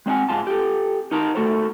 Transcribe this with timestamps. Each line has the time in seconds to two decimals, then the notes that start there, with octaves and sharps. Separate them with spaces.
0.06 G#3 C4 D4 F#5 G#5
0.29 G#2 G#3 F4 A5
0.47 G4 A4
1.11 D#4 A#4 A5 A#5
1.35 A3 F#4 A4 A#4 C5